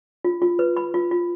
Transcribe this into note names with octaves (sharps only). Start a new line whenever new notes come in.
F4
F4
B4
B5
F4
F4